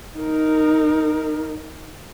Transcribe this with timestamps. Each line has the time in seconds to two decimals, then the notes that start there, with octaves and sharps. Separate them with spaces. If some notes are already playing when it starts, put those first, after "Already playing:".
0.18 D#4 A#4